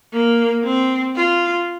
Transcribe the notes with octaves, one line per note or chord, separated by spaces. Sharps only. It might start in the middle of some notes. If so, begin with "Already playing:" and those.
A#3
C4
F4